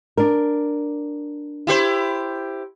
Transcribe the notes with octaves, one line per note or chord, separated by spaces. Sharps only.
D4 A#4
E4 G4 C5